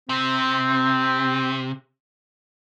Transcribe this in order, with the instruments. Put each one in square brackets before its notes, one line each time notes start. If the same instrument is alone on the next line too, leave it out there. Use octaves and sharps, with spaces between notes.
[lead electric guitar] C3 [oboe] C4